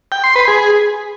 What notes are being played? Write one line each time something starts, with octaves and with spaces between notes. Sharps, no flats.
G5
C6
B4
G#4